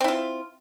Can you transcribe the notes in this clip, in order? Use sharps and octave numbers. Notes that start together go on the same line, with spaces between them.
C4 E4 F4